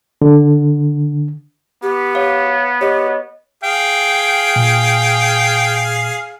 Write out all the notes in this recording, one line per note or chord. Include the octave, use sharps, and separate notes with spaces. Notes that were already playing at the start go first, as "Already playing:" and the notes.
D3
B3 G4
C#5 F5
G4 C#5 D#5
G#4 F5 G5
A#2